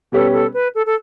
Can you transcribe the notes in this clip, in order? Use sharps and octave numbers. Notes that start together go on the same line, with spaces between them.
B2 G3 C#4 G4 A4 B4
A4
B4
A4
A4